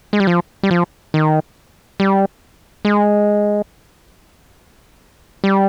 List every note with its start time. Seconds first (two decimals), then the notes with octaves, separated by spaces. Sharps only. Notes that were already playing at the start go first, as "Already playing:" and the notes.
0.13 G#3
0.20 G3
0.27 F3
0.63 G3
0.71 F3
1.14 D#3
2.00 G3
2.85 G#3
5.44 G3